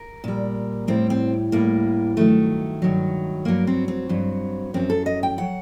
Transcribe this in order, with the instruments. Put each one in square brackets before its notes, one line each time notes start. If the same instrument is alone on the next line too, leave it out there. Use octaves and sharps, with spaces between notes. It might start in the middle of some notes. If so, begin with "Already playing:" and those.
Already playing: [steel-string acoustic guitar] A#4
A#2 G3
A2 G3 C4
C4
A2 G3 A#3
G2 D#3 F#3 A3
G2 D#3 F#3
G2 F#3 A#3
C4
C4
G2 F#3
F#2 F#3 C4
A4
D#5
G5
F#3 F#5